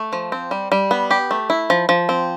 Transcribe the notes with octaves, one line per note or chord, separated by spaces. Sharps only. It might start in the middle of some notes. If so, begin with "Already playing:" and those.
Already playing: A3
F3
C4
G3
G3
B3
G4
A3
E4
F3
F3
C4